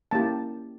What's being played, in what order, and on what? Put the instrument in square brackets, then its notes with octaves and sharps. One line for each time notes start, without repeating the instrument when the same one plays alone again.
[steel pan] A#3 C#4 E4 G4 A5